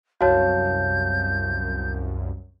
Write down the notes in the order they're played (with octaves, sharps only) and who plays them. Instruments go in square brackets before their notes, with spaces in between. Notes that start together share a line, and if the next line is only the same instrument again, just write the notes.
[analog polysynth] C2 F#2 [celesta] F#4 C#5 [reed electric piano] F5 A5 [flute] G6